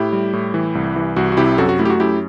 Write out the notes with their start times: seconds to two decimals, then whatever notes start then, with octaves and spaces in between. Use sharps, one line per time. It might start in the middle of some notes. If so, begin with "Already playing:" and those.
Already playing: A2 E4 G4
0.12 G3
0.33 A2
0.54 E3
0.75 C2
0.96 E3
1.16 C2 F#4
1.32 F#4
1.37 C3 E4 G4
1.58 F#2 F#4 A4
1.69 F#4
1.79 A3 E4
1.85 G4
1.90 F#4
2.00 F#2 E4 G4